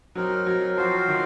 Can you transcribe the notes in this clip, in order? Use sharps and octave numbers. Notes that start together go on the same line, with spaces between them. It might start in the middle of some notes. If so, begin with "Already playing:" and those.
F#3 C4 D#4 A#4
F#3
F3 C4 F#4 C5 F5
D#3